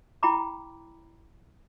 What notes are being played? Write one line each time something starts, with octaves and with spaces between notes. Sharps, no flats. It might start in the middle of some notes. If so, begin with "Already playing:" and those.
E4 G5 A#5 B5 D6